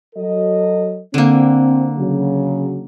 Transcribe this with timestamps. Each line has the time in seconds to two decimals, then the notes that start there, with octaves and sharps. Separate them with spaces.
0.16 F#3 A4 D#5
1.14 D3 A#3 C4
1.98 C#3 F#3